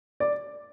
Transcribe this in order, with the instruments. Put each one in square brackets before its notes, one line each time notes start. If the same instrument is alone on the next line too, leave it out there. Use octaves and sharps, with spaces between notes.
[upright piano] D5